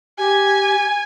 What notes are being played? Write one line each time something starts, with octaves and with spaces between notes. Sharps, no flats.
G4 G#5